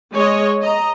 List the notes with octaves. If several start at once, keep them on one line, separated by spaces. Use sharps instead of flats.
G#3 C#5 D#5
D#5 A#5